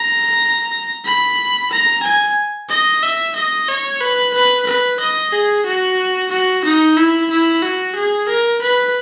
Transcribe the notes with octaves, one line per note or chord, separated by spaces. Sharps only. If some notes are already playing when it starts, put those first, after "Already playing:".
Already playing: A#5
B5
A#5
G#5
D#5
E5
D#5
C#5
B4
B4
B4
D#5
G#4
F#4
F#4
D#4
E4
E4
F#4
G#4
A#4
B4